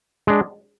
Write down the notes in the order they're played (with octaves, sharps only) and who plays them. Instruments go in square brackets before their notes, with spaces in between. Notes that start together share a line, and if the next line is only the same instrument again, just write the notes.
[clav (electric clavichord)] G#3 D4